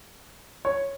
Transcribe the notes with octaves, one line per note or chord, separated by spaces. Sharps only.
C#5